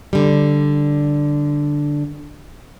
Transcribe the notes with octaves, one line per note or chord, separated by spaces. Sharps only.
D3 G3